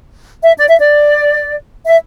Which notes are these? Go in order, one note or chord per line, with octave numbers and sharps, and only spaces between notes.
E5
D5
E5
D5
E5